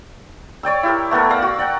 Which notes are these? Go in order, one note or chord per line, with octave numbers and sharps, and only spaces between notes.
C#5 D5 G5 E6
E4 G4 A#4
A3 B3 A4 A#4
D5 F5 A#5 E6
F#4
D5 F#5 G5